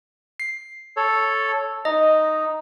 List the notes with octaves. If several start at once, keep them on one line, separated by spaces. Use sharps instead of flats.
C7
A4 C#5
D#4 D#5